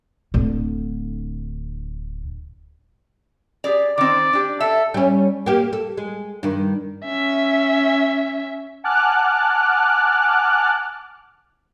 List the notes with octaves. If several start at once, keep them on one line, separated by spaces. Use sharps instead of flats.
D1 D3
G4 G#4 D5
D#3 C4 D5
D4 G4
A4 E5
G3 C#4
A#3 G4
A4
G#3
G2 D#3
C#4 E5
F#5 G#5 A5 D6 F6 F#6